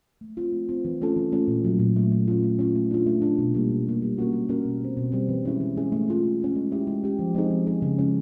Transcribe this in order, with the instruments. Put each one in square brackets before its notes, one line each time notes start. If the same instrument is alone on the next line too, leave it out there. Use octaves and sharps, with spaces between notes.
[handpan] A3
C4 F4
A3
C4 F4
E3
A3 C#4 F4 A4
E3
A3 C#4 F4 A4
A#2
F#3 A3
A#2
F#3 A3
A3
C#4 F4
A3
C#4 F4
A3
D4 F4
A3
D4 F4
B2
G3 A#3
B2
G3 A#3
G3
A#3 C#4 F#4 A#4
G3
A#3 C#4 F#4 A#4
B2
G3 C4
B2
G3 C4
E3
G#3 C#4 E4 G#4
E3
G#3 C#4 E4 G#4
A3
C#4 F4 G#4
A3
C#4 F4 G#4
G#3
C#4 E4 G4
G#3
C#4 E4 G4
F3
G#3 C4 D#4 G#4
F3
G#3 C4 D#4 G#4
C#3
F3 G#3 C#4 E4